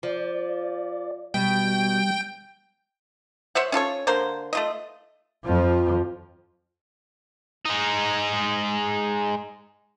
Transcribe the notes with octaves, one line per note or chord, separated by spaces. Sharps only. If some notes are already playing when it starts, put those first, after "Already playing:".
F3 D5
B2 G3 G5
C5 C#5 E5 F#5
C#4 F4 A4 C#5
D3 A#3 A#4 C5
A3 F4 D#5
F2 F3
G#3 D#4